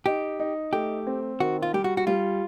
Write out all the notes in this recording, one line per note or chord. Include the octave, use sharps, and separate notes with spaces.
D#4 G4
D#4
A3 G4
C4
D#3 F#4
F4
G3 G4
F#4
F#4
G3 F4